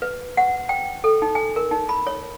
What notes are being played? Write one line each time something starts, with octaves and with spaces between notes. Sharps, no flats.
B4
F#5
G5
A4
D#4
G#5
A#4
D#4
B5
C#5